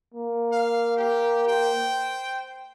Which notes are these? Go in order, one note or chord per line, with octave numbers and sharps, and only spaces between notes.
A#3
F5
G4
C5 G5